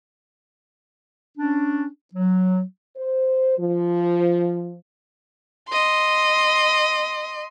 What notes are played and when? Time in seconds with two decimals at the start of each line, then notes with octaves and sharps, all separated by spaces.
1.38 C#4 D4
2.14 F#3
2.96 C5
3.58 F3
5.69 D#5 C6